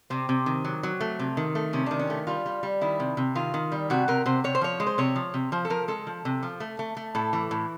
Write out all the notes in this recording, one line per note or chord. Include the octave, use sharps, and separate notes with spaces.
C3 C4
C3
D#3
F#3
F#3
A3
C3
D#3
A3
C3 C#4
D#3 D4
C#4
A3
G3 F4
G3
G3
D#3 E4
C3
C3
D#3 F4
D#3
G3
C3 F#4
C3 A#4
C3 C5
C3 C#5
C5
F3 C#5
G#3
C5
C3 C#5
F3
C3
F3 C5
A4
F3 A#4
G#3 A4
F3
C3
F3
A3
A3
A3
A2 A4
E3
A2